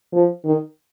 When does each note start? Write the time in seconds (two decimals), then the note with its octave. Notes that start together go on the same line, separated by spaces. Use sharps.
0.13 F3
0.45 D#3